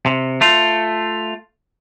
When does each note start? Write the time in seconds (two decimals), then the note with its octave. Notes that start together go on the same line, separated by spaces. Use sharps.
0.06 C3
0.41 A3 F4